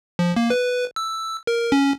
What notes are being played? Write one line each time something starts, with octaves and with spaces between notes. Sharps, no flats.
F3
A#3
B4
E6
A#4
C#4